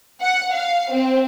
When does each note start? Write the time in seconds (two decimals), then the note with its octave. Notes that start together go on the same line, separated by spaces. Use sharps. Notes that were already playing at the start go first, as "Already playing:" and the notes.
0.21 F#5
0.53 F5
0.93 C4